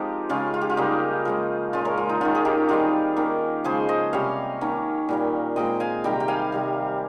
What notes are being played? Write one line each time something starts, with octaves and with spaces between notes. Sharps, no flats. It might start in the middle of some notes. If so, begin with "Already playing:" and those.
Already playing: F3 G#3 C4 D#4 F4 G4 A#4
C#3 G#3 C#4 F4
F4
G4
F4
C#3 G3 A#3 C#4 D#4
F3 G#3 C#4
A#2 G#3 C#4 F4
A#4 C#5
F4
D#4
D#3 A#3 C#4 F4
G#4
D#4 G4
D#3 G3 C4 F4 G#4
D#3 A#3 C#4
C#3 F3 G#3 C#4 G#4 C5
C5 D#5
C3 G3 C#4 C#5 F5
D#3 A#3 C#4
A#2 G3 A#3
A#2 G#3 C4 D#5 G5
F5 G#5
C3 D#3 G3 G5 A#5
G5
F5 G#5
C3 G3 C4